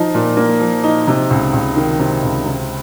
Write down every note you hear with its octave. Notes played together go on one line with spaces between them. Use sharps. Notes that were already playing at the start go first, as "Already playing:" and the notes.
Already playing: F3 D#4
A#2
A#3
F3
D#4
C3
C#2
C#2
D#3
C3
C#2
C3